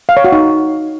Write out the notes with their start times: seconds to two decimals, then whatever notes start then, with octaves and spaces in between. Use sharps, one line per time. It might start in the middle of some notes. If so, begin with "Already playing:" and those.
0.09 F5
0.17 C#5
0.24 F#4
0.32 D#4